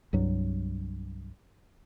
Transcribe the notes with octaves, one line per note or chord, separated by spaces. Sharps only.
C2 G2 F#3